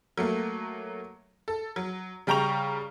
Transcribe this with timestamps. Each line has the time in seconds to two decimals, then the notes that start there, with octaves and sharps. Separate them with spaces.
0.17 F#3 A3 A#3
1.48 A4
1.76 F#3
2.27 C#3 G3 G5 A#5 C#6 F7